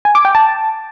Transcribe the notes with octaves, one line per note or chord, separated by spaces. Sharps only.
G#5
D6
G5
A5